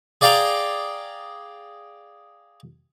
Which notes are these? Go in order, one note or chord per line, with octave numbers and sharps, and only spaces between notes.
G#4 D5 F5 G5 A#5